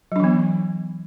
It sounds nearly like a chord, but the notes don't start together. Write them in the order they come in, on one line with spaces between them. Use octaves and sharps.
F#3 D4 E3 B3